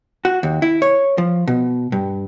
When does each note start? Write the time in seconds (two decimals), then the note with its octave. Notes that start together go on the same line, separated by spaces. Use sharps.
0.25 F#4
0.43 D#2
0.62 E4
0.82 C#5
1.18 F3
1.48 B2
1.92 G2